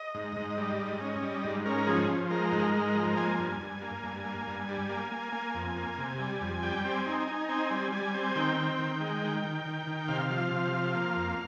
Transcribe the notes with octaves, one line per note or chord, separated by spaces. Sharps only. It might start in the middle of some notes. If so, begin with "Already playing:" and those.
Already playing: D#5
G#2
G#2
G3
G#2
C#4
G3
G#2
C#4 A#4
F3 G#4
F3
G#3 A#4
G#2
A#4
G#3
A#4
F3
A#3 G#5
G2
G2
A#3
G2
A#3
G2
G3
A#3
A#3
A#3
F2
A#3
C3
G3
F2
G3 G5
C4
G#5
D#4
G#5
D#4
C4 G#5
G3
G3 G#5
C4
D#3 G5
C4
D#3
G#3
D#3
D#3
D#3
D#3
C3 F5
F3
C3
F3
A#3
F2